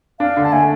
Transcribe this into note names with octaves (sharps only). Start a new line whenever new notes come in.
D4 F5
D3
A5
A3 G#5